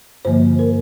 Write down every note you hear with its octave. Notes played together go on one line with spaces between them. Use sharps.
G2 D3 F3 A#3 C5
A#4